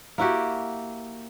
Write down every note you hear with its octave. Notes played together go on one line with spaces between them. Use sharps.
A#3 E4 F#4 G4